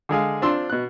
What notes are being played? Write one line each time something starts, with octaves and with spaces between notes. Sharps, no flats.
D3 G#3 G#4 F5
C4 D4 F4 C6 E6
B2 F#6